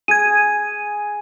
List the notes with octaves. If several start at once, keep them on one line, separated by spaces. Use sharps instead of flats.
G#4 G#6 D#7